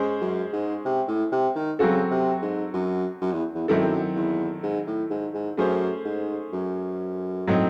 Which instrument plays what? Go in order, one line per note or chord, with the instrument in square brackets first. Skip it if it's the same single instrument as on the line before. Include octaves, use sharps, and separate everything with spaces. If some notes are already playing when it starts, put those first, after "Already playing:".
Already playing: [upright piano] G#3 C#4 G#4 C5
[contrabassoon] F#2
G#2
C3
A2
C3
D#3
[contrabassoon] C#3 [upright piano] F#3 C4 F#4 A4
[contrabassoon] C3
G#2
F#2
F#2
E2
E2
[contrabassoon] F#2 [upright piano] D#3 F#3 C4 E4 A4
[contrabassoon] E2
G#2
A2
G#2
G#2
[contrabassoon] F#2 [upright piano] A3 C#4 G#4 C5
[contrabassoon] G#2
F#2
[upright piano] A2 F#3 C4 D#4